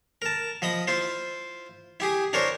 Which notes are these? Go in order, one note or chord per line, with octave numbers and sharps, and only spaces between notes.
A#4 A5
F3 D#5 B5 D#6
E4 F4 C5
E4 G4 G#4
D4 E4 A#4 C5 C#5